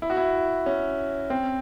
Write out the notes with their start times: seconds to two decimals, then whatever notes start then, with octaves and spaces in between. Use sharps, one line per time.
0.02 E4
0.10 F#4
0.17 E4
0.66 C#4
1.30 C4